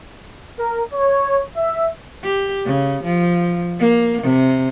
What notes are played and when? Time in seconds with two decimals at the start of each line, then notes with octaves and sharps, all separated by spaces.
0.59 A#4
0.93 C#5
1.57 E5
2.23 G4
2.66 C#3
3.03 F3
3.80 A#3
4.22 C3